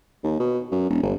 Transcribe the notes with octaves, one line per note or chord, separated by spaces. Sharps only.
D#2
B2
F#2
E1
G1